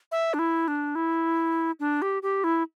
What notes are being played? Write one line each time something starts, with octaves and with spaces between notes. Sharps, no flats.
E5
D4
E4
D4
E4
D4
G4
G4
E4